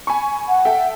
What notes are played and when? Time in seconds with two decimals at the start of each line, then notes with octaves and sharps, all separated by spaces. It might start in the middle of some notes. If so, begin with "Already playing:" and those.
0.07 G#5 B5 C#6
0.48 F#5
0.65 A4 E5 G5